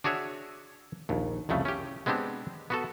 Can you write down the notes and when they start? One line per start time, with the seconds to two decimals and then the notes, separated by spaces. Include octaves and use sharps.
0.04 D4 F#4 G#4 C#5 E5
1.09 A#1 D#2
1.49 C2 F2 C#3 A3
1.65 C#4 G4
2.06 G#3 B3 C4 D4 G4
2.70 B3 F#4 A4